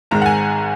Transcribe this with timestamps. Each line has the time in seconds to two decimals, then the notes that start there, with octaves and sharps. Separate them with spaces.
0.11 G#1 G#2 D#3 G#3 A#5
0.22 F#5
0.26 G#5